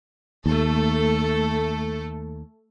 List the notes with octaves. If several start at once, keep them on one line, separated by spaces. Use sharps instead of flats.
D#2 A3 A4